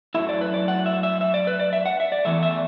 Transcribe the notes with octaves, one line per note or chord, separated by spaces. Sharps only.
F#2 F#3 A3 E4 E5
D5
B4
D5
F#5
E5
E5
E5
D5
B4
D5
E5
F#5
E5
D5
E2 E3 A3 E5
E5